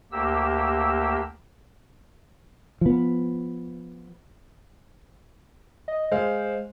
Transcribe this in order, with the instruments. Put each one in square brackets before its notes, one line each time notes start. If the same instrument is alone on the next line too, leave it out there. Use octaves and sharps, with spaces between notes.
[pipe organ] D2 A#3 G4 E6
[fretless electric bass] F3 B3
[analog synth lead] D#5
[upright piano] G#3 F5 [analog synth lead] C5